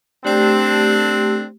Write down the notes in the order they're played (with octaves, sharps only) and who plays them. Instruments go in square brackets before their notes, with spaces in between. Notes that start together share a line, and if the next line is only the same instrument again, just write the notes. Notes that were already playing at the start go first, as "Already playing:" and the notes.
[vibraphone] A3 G4 [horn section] C4 D4 A4